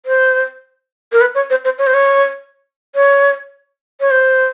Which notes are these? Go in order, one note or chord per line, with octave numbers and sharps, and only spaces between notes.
C5
A#4
B4
C#5
C5
C5
C#5
C5
C#5
C#5
C#5
C5